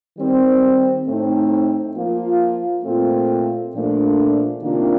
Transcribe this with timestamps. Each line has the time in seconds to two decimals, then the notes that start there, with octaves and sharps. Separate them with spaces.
0.17 D#3 G3 C4
1.06 A2 A3 C4 D#4
1.96 F3 A#3 F4
2.85 A#2 A3 C4 F4
3.74 A#2 F3 A3 D4
4.63 C3 D#3 A#3 D4 F4